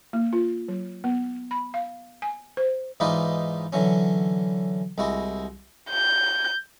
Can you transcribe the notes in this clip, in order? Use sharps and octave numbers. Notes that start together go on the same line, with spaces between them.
A#3
F4
F#3
B3
B5
F5
G#5
C5
G#2 E3 D#4 F4 B4 D5
D3 E3 F#3 C#4
C2 G#3 E4 F#4
G6